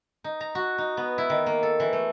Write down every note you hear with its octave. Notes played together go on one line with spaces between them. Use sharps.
D#4
A#5
F#4
D#4
B3
E4
D#3
A#3
A4
E3
A3